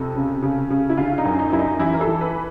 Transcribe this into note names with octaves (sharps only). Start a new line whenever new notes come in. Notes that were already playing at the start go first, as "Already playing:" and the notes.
Already playing: F2 C3 A4
C#3
C#3
C#3
E4
D3 F4
D#4
F#2
D#4
F#2 E4
D#4
E3 E4
A#4
A4
E3
B4